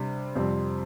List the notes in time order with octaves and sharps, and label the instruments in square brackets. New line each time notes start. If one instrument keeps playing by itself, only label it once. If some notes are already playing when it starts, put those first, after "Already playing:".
Already playing: [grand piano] C3 G3 D4
F2 C3 G3 C4